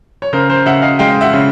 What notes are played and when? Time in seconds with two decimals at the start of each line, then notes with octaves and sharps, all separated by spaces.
0.22 C#5
0.33 C#3 A#4 C5
0.50 A#4 C5
0.66 C#3 E5 F#5
0.82 D#5 F5
0.99 G#3 F5 G5
1.21 E5 F#5
1.33 C#3